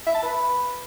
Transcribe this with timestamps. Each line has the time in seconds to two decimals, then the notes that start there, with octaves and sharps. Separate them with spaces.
0.06 E5
0.15 A5
0.23 B4